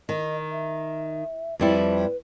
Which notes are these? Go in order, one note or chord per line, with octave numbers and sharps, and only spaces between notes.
D#3 D#5
E5
F2 G3 E4 B4